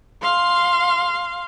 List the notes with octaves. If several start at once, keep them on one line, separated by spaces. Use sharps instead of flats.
F5 C6